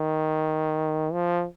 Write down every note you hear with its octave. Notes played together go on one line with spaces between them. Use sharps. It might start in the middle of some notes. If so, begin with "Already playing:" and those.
Already playing: D#3
F3